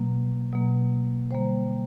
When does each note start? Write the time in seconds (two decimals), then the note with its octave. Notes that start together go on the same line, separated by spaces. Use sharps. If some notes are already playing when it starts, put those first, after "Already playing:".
Already playing: B2 F#3 A#3
0.52 B2 F#3 A#3
1.31 D3 G3 A#3 C5